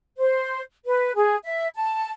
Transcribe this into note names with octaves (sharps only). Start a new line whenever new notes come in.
C5
B4
G#4
E5
A5